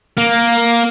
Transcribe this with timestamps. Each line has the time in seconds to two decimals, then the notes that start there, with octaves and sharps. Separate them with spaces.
0.18 A#3